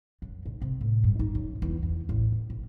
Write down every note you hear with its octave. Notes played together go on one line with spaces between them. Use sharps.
F#2
B1
C3
A2
G2
D#4
F#2
E2
E2
A1
G1
A#1